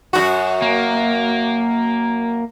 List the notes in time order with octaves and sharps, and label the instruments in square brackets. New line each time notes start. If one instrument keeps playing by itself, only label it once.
[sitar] F#2 A2 F#4
[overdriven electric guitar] A#3